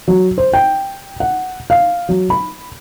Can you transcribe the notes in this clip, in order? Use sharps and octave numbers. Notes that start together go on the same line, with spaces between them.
F#3
C5
G5
F#5
F5
F#3
B5